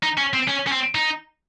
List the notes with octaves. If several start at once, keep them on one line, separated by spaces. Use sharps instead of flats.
D#4
C#4
C4
C#4
C#4
C4
D#4